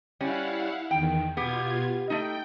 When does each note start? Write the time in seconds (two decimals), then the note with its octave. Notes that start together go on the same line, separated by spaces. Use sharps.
0.20 G3 C#4 E4 F5 F#5
0.91 E2 D#3 G5
1.37 B2 B3 F4 G4 G#6
2.10 A3 D#4 G5